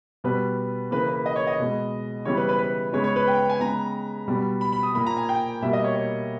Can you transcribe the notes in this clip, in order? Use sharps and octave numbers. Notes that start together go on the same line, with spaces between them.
B2 G3 B3 B4
C#3 E3 A#3 B4
B4
D#5
C#5
D#5
B2 G#3 B3
C#3 E3 G3 B3 C#5
B4
B4
B4
C#3 G#3 B3 C#5
C#5
B4
G5
G5
G#5
C#3 G#3 B3 A#5
B2 G3 B3
B5
B5
D#6
A#2 A#3 B5
A#5
G#5
G5
B2 G3 A#3 E5
D#5
C#5
C#5